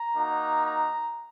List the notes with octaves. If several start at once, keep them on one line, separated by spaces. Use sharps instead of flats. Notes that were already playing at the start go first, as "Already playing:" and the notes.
Already playing: A#5
A#3 D#4 F#4
A#5